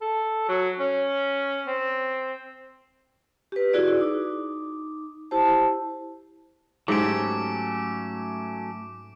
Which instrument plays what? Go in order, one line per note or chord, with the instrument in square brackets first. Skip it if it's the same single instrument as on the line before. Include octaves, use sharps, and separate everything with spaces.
[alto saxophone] A4
F#3
C#4
C4
[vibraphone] G4 B4
E4 F#4 G#4 D5
D#4 D6
E4 G4 C5 A5
[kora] G#2 G4 [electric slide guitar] F#3 A3 C#4 [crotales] D6 D7